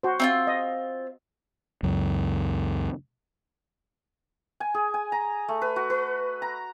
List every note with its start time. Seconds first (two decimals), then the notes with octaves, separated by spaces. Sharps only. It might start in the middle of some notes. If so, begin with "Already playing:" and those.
0.03 F#4 C5
0.20 C4 D#4 F4
0.47 D#5
1.83 C#2 F#2
4.60 G#5
4.74 G#4
4.94 G#5
5.12 A#5
5.48 A3
5.62 B4
5.76 F#4
5.90 B4
6.42 A#5